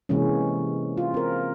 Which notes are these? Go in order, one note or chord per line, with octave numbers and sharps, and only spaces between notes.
C3 E3 G#3 A#3 C#4
F4
C4 A#4